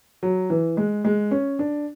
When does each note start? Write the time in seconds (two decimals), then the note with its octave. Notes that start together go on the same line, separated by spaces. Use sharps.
0.23 F#3
0.50 E3
0.77 G#3
1.05 G#3
1.31 C#4
1.59 D4